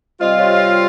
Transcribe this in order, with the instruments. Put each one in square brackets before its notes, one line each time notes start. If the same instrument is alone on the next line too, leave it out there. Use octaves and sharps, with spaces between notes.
[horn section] C3 G3 C4 F4 [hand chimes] C5 D#5
[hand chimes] C#5 F5
C#5 F5